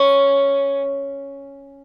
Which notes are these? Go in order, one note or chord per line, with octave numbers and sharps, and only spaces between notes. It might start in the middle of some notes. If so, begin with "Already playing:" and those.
Already playing: C#4